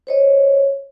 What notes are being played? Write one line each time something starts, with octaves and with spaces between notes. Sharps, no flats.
C5 C#5 D#5